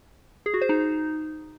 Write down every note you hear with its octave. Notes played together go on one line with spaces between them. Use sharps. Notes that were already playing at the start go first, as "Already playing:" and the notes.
G#4
F#4
C5
D#4